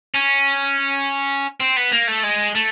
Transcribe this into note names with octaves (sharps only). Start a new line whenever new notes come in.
C#4
C4
B3
A#3
A3
G#3
A3